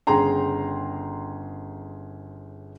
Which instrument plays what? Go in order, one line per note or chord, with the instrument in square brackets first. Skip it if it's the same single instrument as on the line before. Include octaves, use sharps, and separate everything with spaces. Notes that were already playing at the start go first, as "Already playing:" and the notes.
[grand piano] G1 C#3 G#4 G5 A#5 C6